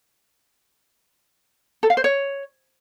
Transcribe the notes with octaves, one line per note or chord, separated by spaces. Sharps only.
A4
F5
C5
C#5